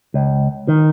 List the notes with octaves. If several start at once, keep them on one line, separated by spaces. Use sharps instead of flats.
C#2
D#3